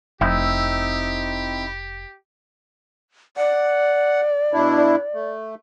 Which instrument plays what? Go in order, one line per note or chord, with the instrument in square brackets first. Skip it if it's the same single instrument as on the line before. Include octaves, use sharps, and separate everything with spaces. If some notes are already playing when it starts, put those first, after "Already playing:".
[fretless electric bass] F1 [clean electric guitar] C4 D#4 E4 [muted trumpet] G4
[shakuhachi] D5 [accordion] F#5
[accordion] B2 D4 E4
A3